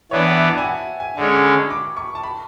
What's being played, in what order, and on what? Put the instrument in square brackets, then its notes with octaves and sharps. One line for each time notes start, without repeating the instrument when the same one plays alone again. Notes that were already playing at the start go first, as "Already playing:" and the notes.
[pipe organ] E3 B3 D4 [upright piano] C#5
[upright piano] F#5
E5
A5
G#5
F#5
G#5
[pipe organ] D3 G#3 C#4 [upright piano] A5
[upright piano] C#6
B5
D6
C#6
A5
B5